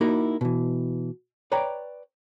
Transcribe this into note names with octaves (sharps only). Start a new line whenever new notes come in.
A#3 D#4 E4 F#4 A#4
B2 E3
B4 C#5 D5 G5 A#5